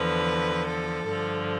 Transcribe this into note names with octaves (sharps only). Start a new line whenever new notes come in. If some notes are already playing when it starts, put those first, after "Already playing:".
Already playing: E2 D3 F3 B4
A4
G2 D3 F3